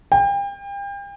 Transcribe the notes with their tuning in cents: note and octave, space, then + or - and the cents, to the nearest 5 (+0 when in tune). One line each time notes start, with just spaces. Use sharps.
G5 +35